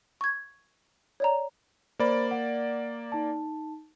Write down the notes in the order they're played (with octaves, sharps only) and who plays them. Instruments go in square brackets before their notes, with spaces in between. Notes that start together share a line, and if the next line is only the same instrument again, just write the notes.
[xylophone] C#6 G#6
C#5 D5 A#5
[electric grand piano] A#3 D5 [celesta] C5 B5
[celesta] F#5
D#4 A5